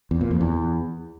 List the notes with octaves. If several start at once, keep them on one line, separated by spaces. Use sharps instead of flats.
E2
A#2
F2
E2